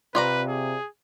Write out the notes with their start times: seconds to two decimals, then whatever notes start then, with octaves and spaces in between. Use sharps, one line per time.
0.15 C3 F4 B4 D5 A#5
0.49 G#4